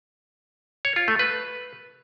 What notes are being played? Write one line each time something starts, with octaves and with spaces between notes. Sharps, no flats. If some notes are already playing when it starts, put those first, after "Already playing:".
C#5
F4
A3
B4